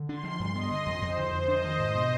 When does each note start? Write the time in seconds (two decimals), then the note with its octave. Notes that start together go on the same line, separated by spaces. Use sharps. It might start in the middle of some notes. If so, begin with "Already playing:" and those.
Already playing: D3
0.09 D4 C6
0.24 F3
0.40 G2
0.55 B3 D#5
0.71 D3
0.86 F2
1.02 F2 C5
1.17 D3
1.33 F2
1.48 D4 D#5
1.64 D#3
1.80 G#2
1.95 B2